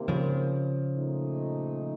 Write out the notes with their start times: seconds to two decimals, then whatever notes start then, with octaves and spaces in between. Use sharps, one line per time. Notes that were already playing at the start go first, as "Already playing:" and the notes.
Already playing: C3 D#3 A#3
0.08 C#3 F3
0.96 A#2 A3 D#4